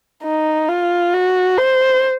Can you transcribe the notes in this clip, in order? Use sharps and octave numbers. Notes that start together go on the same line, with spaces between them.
D#4
F4
F#4
C5